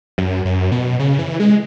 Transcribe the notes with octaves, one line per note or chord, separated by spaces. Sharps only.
F#2
F#2
B2
C#3
E3
G#3